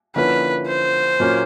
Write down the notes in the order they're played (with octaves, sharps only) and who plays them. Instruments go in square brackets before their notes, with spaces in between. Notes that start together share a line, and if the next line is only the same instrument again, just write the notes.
[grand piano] D3 F3 A#3 C#4 E4 [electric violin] B4
[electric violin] C5
[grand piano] A#2 F#3 A#3 C#4